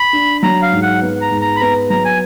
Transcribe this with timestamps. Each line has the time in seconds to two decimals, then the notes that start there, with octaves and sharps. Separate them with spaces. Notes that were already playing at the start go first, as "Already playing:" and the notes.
Already playing: B5
0.13 D4
0.43 F#3 A#5
0.62 F5
0.72 G#2
0.82 F#5
1.02 B3
1.21 A#5
1.31 G#2
1.41 A#5
1.56 B5
1.60 B3 A#5
1.90 F#3 A#5
2.05 G#5